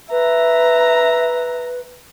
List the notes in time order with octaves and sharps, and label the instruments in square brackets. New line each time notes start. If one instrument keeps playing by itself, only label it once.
[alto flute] B4 [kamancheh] E5 A#5